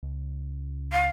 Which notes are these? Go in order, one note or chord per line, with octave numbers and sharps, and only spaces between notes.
C#2
F5